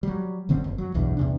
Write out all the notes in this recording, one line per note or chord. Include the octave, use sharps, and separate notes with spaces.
F#3 G3
F#1 D3 C4 C#4
F#1
F#3
B1 E2 G2
E2 C3 D4